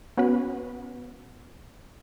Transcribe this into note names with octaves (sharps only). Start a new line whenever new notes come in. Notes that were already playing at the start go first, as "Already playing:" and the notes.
B3 C#4 F#4 B4